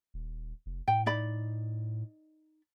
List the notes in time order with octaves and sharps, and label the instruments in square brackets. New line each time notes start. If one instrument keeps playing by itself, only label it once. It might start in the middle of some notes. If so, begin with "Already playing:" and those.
[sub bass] D#1
F1
[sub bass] A2 [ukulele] G5
[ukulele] D#4 D5 B5